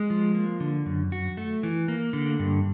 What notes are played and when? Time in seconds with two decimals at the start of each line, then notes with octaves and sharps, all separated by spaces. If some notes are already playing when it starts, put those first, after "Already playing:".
Already playing: G#3
0.10 F3
0.35 A#3
0.60 D3
0.86 F#2
1.12 F#4
1.37 A3
1.63 E3
1.88 A#3
2.13 D3
2.39 G2